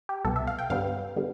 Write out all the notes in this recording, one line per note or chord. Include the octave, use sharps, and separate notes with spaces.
G4
C2 B2 B3 A4
E5
F5
G5
G2 D3 G3 B3 F5
D3 G3 B3